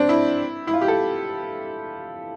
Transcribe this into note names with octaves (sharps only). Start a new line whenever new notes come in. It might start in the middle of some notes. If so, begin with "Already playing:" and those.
Already playing: C4 D4
E4
E4
F4
G4
A4